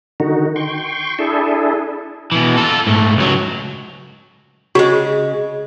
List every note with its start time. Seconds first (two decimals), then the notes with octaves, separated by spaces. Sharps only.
0.20 D3 D#3 D#4 F#4
0.56 G5 C6 C#6
1.19 D4 E4 G#4 A4
2.32 B2 E3
2.57 F4 A4
2.87 G#2 A3
3.17 C#2 F#3
4.75 C#3 G#3 F#4